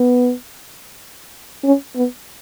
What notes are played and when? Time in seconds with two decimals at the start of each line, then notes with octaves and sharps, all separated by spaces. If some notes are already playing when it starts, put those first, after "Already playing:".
Already playing: B3
1.64 C#4
1.96 B3